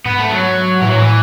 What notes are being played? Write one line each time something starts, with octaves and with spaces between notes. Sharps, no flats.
G#2 B3
A3
F#3
A2 E3
F#3
E3